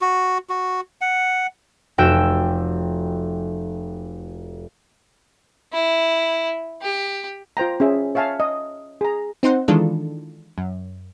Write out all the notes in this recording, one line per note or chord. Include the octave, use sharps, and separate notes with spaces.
F#4
F#4
F#5
F1 F#4 G5 E6 D7 E7
E4
G4
F4 C5 G5 A#5
C#4 G#4 E5
C#5 E5 F5 G#5 A5
D#5
G#4 A#5
C4 D#4 C5 F#5
D#3 E3 G#3 D4 F4 A4
F#2